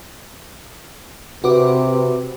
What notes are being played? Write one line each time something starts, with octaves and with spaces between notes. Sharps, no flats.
C3 F#4 B4 D6